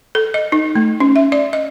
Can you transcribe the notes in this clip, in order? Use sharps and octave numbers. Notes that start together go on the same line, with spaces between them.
A4
D#5
D#4
A3
C#4
E5
D5
D#5